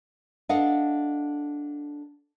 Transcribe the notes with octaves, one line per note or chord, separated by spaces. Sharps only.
D4 A4 D#5 F5 F#5